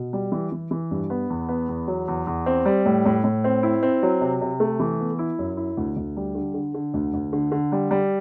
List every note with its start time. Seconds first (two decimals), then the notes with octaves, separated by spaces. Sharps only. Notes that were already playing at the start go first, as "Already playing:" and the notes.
Already playing: B2
0.13 G3
0.32 E3
0.52 E3
0.71 E3
0.91 G2
1.10 B3
1.30 E2
1.49 B3
1.69 E2
1.88 F#3
2.08 E2
2.27 E2
2.46 C4
2.66 G3
2.86 A2
3.05 A2
3.24 A2
3.44 C4
3.63 E4
3.83 C4
4.03 F#3
4.21 C3
4.41 C3
4.60 A3
4.80 E3
5.00 B3
5.19 E4
5.39 F#2
5.57 E4
5.77 D2
5.97 D2
6.17 G3
6.35 D3
6.54 D3
6.74 D3
6.94 D2
7.14 D2
7.33 D3
7.52 D3
7.72 G3
7.91 G3